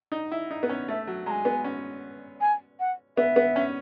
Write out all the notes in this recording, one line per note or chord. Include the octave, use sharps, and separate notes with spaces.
D#4
E4
D#4
B3
C#4
A3 E5
F#3
G#3 G#5 A#5
B3
C#4
G#5
F#5
B3 E5
B3
C#4